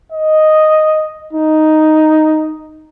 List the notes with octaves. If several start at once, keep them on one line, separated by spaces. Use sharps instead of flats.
D#5
D#4